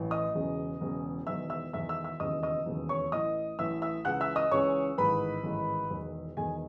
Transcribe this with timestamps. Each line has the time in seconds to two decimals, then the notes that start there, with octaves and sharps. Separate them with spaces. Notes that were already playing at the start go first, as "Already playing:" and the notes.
Already playing: A1 A2 E3
0.11 D#5 D#6
0.34 E1 E2 C#3
0.81 E1 E2 C#3
1.27 E1 E2 D#3 E5 E6
1.50 E5 E6
1.73 E1 E2 D#3 E5 E6
1.89 E5 E6
2.04 E5 E6
2.20 E1 D#2 C#3 E3 D#5 D#6
2.43 D#5 D#6
2.66 E1 D#2 C#3 E3
2.89 C#5 C#6
3.12 A1 A2 E3 D#5 D#6
3.59 A1 A2 E3 E5 E6
3.82 E5 E6
4.05 C#2 C#3 E3 F#5 F#6
4.20 E5 E6
4.36 D#5 D#6
4.51 C#2 C#3 E3 C#5 C#6
4.98 A1 G#2 D#3 B4 B5
5.44 A1 G#2 D#3
5.90 E1 E2 D#3
6.37 E1 E2 D#3 G#4 G#5